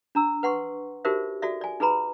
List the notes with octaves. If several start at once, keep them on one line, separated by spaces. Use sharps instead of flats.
D4 A#5 E6
B4 F#5 C6 C#6
D#4 F#4 G4 A#4 C5 E5
F#4 A4 D5 E5
D5 G#5
D#4 G#4 B4 A#5 B5